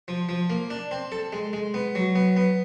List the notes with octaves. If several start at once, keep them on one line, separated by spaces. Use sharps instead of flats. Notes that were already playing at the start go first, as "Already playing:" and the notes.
F3
F3
A#3
D4
C4
A4
G#3
G#3
B3
F#3
B3
B3